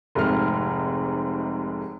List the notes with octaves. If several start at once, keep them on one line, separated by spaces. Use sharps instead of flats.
F1 G#2 C3 A3 F6